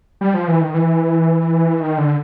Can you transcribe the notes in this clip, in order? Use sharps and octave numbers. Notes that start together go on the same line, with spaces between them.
G3
F3
E3
D#3
E3
D#3
D3